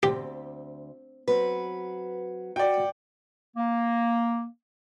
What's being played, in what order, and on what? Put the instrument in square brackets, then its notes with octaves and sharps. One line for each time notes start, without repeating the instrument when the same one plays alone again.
[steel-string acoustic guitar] D2 [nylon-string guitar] C4 [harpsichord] G4
[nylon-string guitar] F#3 C4 [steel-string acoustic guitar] B4
[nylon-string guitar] F#4 [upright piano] D5 G5
[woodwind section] A#3